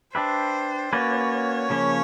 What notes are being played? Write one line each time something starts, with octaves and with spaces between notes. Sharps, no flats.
D4 G4 B4 C5 E5
A#3 C#4 F#4 B4 C#5 D5
C#3 F3 A#3 C#4